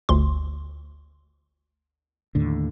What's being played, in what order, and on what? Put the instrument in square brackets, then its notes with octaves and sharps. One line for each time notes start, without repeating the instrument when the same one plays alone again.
[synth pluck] G1 D2 C6
[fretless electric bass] D#2 A2 D3